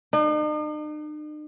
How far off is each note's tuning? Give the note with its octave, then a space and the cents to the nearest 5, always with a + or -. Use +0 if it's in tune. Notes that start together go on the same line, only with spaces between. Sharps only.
D#4 -45